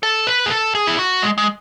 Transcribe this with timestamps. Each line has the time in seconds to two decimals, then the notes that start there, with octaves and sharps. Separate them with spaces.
0.03 A4
0.27 B4
0.46 G#4
0.51 A4
0.75 G#4
0.87 E4
0.99 F#4
1.22 G#3
1.38 G#3